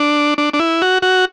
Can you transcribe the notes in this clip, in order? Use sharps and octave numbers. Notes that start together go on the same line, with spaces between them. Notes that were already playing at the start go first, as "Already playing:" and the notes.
Already playing: D4
D4
D4
E4
F#4
F#4